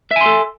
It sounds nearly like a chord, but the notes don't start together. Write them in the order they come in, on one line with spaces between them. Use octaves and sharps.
E5 G#5 C6 A4